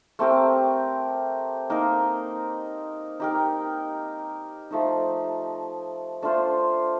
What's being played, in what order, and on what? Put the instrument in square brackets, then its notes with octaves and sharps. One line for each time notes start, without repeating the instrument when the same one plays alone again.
[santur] A3 C4 G4 A#4
A#3 D#4 A#4
D#4 G4 A#4
F3 A3 D#4
A3 D4 F4 C5